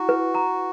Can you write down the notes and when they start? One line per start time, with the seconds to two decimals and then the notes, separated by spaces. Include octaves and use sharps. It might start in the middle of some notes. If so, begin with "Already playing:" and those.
Already playing: E4 F#4
0.09 B4
0.35 A#5